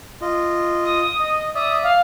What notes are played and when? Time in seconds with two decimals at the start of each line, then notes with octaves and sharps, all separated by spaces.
0.22 F4 D#5
0.85 D#6
1.20 D#5
1.55 D5 E5 D#6
1.83 F5